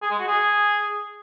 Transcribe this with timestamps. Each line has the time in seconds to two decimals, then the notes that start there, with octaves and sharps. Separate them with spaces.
0.02 G#4
0.11 G#3
0.19 F#4
0.28 G#4